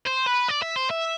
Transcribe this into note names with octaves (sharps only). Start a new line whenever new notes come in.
C5
B4
D5
E5
C5
E5